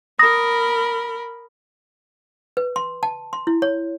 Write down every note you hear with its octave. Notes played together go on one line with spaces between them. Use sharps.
A#4 B5 D#6 A#6
B4
C6
A5
C6
E4
C#5